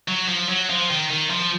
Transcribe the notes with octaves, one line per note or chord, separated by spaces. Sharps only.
F#3
F3
F#3
F3
D#3
D#3
F3